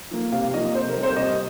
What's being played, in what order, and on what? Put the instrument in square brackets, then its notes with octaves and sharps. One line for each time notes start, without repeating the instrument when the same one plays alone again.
[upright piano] F3 A#3
C3 F5
F3 A#3 D#5
C3 C5
A#4
G3 C4
C5
C3 D#5